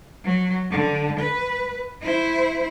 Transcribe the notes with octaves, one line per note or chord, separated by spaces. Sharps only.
F#3
D3
B4
E4 C5